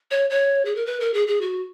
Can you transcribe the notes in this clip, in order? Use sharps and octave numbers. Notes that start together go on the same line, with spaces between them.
C#5
C#5
G#4
A#4
B4
A#4
G#4
G#4
F#4